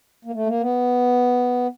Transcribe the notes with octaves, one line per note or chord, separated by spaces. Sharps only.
A#3
A3
A#3
B3